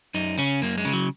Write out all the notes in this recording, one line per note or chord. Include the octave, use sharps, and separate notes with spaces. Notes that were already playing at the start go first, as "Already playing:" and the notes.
F#2 D#4
C#3 C#4
F#2 A#3
G#3
C#3
F#3